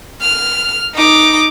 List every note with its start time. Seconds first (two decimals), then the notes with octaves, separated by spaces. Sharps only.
0.21 F6
0.95 D#4 D6